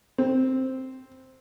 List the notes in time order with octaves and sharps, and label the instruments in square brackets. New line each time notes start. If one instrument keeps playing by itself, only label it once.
[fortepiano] C4